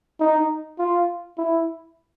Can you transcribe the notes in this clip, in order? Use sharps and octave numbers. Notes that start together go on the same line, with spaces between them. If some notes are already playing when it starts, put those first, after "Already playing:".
D#4
F4
E4